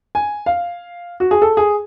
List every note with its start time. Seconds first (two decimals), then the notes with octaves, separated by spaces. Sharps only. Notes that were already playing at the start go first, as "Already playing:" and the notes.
0.15 G#5
0.46 F5
1.20 F#4
1.31 G#4
1.42 A4
1.57 G#4